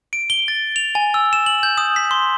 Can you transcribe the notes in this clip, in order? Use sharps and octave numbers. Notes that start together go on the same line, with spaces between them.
D7
G7
A6
F7
G#5
E6
E7
F#7
G6
D#6
B6
C6